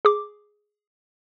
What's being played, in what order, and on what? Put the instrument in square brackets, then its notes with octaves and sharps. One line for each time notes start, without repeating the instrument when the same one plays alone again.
[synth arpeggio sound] G#4 D6